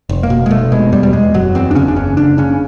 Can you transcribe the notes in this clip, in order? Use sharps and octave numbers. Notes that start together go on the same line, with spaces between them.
F1
A#3
B2
G#3
F1 A3
B2 G#3
E2 G3
G3
E2 G#3
F#1 F#3
E2 C4
D4
C#3 C#4
D4
F#1 C#4
F#1 D4
C#3 C#4